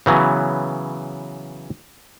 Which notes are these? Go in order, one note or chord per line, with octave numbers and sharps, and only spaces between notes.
C#3 E3 F#3 B3